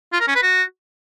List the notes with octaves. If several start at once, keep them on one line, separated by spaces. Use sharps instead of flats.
F4
A#4
C#4
B4
F#4